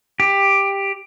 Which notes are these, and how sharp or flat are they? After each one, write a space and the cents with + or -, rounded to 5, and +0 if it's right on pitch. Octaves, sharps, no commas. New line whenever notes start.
G4 +10